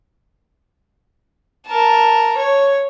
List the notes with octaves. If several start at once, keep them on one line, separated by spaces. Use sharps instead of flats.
A#4 A5
C#5